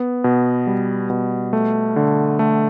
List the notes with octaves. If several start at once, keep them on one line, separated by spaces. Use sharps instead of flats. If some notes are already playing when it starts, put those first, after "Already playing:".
Already playing: B3
B2
G3
B2
A3
D3
A3